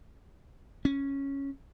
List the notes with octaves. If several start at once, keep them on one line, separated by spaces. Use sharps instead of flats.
C#4